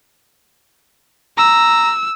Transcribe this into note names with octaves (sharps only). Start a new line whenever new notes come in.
A#5 E6